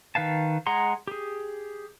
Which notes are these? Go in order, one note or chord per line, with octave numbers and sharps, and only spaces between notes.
D#3 B4 F5 A5
G#3 G#4 F#5 A#5 C6
G4 G#4